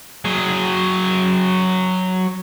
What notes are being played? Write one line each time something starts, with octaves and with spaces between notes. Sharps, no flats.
F#3 G#4